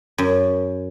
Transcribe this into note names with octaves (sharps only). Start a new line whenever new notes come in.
F#2